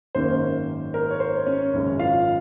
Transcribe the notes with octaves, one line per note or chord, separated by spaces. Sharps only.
G#1 F#2 D#3 A#3 C#4 C5
A#4
C#5
C5
C#4 C#5
G#1 F#2 C#3
F4 F5